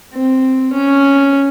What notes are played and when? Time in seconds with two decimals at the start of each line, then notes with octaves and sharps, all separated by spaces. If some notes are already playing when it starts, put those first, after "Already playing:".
0.14 C4
0.73 C#4